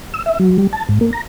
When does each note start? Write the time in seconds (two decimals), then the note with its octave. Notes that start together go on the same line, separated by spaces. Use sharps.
0.14 E6
0.26 E5
0.39 F#3
0.58 G3
0.73 A5
0.89 G#2
1.01 A#3
1.13 A#5